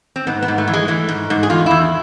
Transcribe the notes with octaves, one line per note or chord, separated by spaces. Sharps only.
C4
G#2 B3
B3
G#2
A3
E3
G#3
E3 A3
G#2
G#2
G#4
E2 F4
E2 E4